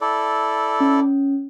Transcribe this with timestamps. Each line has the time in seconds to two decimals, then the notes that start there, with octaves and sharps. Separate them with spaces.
0.01 E4 A4 D5
0.80 C#4